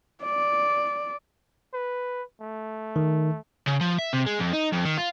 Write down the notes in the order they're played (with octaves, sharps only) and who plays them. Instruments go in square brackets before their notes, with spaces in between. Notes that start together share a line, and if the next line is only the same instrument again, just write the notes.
[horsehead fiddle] D5
[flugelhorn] B4
A3
[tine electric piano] D#3
[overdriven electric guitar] C#3
F3
E5
C3
G#3
F2
D#4
F2
D#3
F4